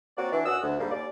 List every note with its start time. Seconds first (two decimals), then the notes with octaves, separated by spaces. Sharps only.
0.18 A#3 C4 F#4 C#5 D5
0.32 E3 D4
0.46 F#2 C#4 F#4 F#5 D#6 E6
0.64 D2
0.79 G#2 D3 G3 A#3
0.92 D#2 D5